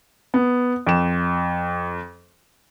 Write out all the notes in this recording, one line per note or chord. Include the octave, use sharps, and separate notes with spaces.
B3
F2 E7